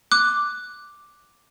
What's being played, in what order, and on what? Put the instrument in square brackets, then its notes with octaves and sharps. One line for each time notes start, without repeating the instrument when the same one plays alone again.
[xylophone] D6 F#6